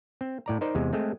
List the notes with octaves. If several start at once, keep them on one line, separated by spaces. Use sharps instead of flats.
C4
A2 D5 A#5
D#4 A#4 C5 D5
E2 C3 G#3
G#3 A3 C4